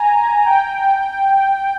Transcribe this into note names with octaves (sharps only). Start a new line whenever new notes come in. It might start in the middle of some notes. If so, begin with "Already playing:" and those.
Already playing: G#5 A#5
G5